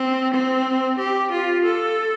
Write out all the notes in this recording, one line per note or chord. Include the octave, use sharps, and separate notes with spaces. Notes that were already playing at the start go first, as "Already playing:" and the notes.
Already playing: C4
C4
G4
F4
A4